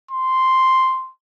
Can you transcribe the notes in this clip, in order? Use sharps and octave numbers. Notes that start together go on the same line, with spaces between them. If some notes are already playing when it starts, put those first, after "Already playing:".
C6